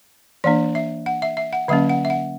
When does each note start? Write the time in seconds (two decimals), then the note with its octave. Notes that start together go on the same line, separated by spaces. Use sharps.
0.44 E3 A#3 D4 D5
0.75 E5
1.06 F#5
1.22 E5
1.37 E5
1.53 F#5
1.68 D3 F#3 A#3 C#4 E5
1.89 F#5
2.05 E5
2.10 F#5